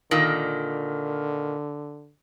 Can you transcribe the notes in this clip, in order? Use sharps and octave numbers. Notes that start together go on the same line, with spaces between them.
A#2 D3 D#3